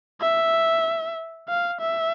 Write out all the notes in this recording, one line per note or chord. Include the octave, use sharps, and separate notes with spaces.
E5
F5
E5